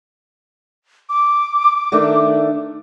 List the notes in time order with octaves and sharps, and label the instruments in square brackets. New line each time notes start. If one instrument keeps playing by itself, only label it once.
[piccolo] D6
[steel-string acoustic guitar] D#3 A3 D4